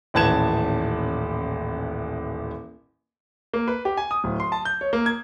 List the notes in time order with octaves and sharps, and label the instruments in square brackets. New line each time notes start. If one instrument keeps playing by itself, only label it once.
[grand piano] D#1 A1 B4 A5 G#6 E7
A#3
B4
G4
G#5
D#6
D1
C6
A5
G6
C#5
A#3
G#6